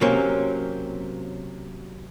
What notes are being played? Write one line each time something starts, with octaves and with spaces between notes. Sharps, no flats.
C3 F#3 A#3 C4 C#4